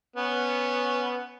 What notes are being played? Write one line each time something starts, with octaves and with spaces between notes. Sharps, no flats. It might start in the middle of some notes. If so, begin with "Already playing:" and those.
B3 C#4